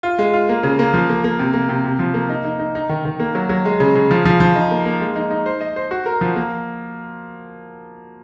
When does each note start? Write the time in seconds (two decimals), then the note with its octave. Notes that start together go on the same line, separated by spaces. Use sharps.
0.03 F4
0.19 G#3
0.33 F4
0.49 A#3
0.63 C#3
0.79 A#3
0.94 F3
1.09 A#3
1.24 A#3
1.39 C3
1.54 A#3
1.69 C3
1.84 C3
1.99 F3
2.14 A#3
2.29 D#4
2.44 D#4
2.59 D#4
2.75 D#4
2.89 D#3
3.05 D#3
3.20 A#3
3.35 F#3
3.49 F#3
3.65 G#3
3.80 C#3
3.95 C#3
4.11 F3
4.25 F3
4.40 F3
4.55 D#4
4.71 A#3
4.85 A#3
5.00 G#3
5.16 D#4
5.30 D#4
5.46 C5
5.61 D#5
5.76 C5
5.91 F#4
6.06 A#4
6.21 F3
6.36 A#3